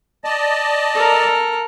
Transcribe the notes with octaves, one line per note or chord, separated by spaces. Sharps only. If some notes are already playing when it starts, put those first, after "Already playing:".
D5 D#5 A5
A4 A#4